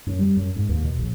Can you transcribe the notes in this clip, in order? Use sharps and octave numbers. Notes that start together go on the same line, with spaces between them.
F#2
G3
F#2
G#2
D#2
B2
A#1